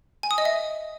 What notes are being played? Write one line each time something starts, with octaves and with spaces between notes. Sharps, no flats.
G#5
D#6
D#5
E5